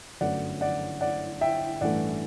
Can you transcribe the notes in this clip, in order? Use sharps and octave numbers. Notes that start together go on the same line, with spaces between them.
G1 F#2 F#3 A3 D5 F#5
D5 F#5
D5 F#5
E5 G5
A1 G2 E3 A3 D5 F#5